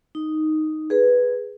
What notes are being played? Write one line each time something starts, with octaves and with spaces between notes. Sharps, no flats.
D#4
G#4 B4